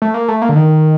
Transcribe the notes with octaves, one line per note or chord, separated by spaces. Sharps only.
A3
A#3
A3
A#3
D3
D#3